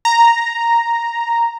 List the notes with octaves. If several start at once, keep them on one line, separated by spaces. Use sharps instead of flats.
A#5